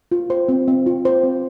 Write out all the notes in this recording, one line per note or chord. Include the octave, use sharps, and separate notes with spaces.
F4
C5
C4
C4
F4
C5
C4